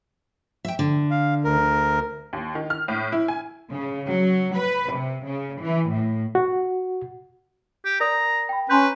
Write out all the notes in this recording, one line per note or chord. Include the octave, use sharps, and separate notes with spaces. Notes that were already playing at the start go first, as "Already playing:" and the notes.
E5 G5
D3
F5
D2 A#4
D#2
D#3
F6
A2
E4
G#5
C#3
F#3
B4
C3
C#3
E3
A2
F#4
G4
A#4 D5 A#5 D#6
G5 B5
C#4 B4 A#5 C6 G6